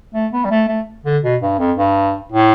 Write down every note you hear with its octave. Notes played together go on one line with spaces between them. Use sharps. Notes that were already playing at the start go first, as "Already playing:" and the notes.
A3
B3
G3
A3
A3
D3
B2
G2
F2
G2
A2